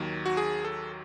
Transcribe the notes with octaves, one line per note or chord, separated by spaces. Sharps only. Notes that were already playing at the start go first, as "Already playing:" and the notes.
Already playing: D#2 D#3 F#3
F#4
G#4
A4